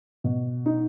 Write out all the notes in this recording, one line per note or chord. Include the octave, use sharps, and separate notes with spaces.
B2
D#4